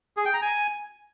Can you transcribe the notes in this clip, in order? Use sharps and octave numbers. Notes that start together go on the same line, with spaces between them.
G#4
G5
A#5
G#5